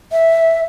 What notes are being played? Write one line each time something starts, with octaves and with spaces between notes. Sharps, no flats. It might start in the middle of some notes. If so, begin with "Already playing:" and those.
E5